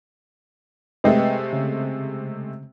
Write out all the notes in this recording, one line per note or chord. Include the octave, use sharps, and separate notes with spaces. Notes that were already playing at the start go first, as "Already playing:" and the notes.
C3 G#3 A3 B4 D#5 G5
C#3